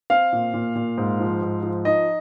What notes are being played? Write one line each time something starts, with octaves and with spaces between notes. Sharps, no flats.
C4 F5
A#2
A#2
A#2
G#2
F3
G#2
F3
D#4 D#5